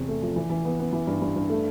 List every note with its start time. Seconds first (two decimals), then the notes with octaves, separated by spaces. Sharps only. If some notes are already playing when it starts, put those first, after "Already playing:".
Already playing: E2 C3
0.08 A3
0.22 F3
0.36 E3
0.50 E3
0.65 B3
0.79 B3
0.93 E3
1.07 G2
1.21 G2
1.35 G2
1.50 A3